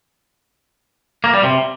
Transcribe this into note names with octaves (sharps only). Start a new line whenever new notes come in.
A#3
G3
C3